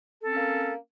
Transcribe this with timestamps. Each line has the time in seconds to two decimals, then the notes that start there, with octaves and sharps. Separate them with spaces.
0.23 A4
0.27 C4
0.31 C#4
0.35 A#3